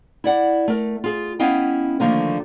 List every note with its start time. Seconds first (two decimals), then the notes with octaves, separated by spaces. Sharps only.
0.24 E4 D5 F#5
0.68 A3 A#4
1.04 F4 G#4
1.40 B3 C#4 E4 D#5 F5 G5
2.00 D3 D#3 F3 A3 A#3